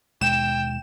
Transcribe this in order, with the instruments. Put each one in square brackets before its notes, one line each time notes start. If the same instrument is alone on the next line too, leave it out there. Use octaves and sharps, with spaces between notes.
[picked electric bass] D#2 B2 G#3 [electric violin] G5 [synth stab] E7